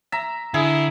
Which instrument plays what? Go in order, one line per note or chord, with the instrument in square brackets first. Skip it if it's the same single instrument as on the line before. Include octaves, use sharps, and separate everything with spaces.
[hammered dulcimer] E5 A#5
[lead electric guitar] D3 [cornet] E4 [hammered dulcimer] G#4